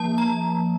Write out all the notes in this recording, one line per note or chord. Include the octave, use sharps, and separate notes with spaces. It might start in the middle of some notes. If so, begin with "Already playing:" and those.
Already playing: F3 A#3 A5
A#5